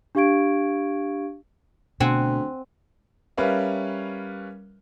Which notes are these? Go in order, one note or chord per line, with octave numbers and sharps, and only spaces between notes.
D4 G4 F5 C#6 G#6 D7
D2 B2 C4 F#5 G#5
G3 C#4 A#4 B4 E5 F5